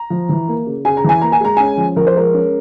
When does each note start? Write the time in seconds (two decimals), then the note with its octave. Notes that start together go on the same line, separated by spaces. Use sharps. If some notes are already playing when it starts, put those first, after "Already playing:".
Already playing: A#5
0.10 F3
0.29 E3
0.48 A#3
0.67 C#3
0.85 C#3 G#5
0.97 A#5
1.04 E3 G#5
1.21 A#3 A#5
1.32 G#5
1.41 G#3 A#5
1.57 C#4 G#5
1.77 F3
1.96 F3 A#4
2.07 C5
2.15 G#3 A#4
2.34 C#4